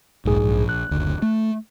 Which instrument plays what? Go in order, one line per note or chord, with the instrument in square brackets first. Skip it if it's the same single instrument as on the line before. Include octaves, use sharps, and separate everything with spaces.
[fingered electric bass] D#1 [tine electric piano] B1 G#2 G#4
[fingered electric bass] A#1
[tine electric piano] F#6
[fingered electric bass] F#1 D2
A3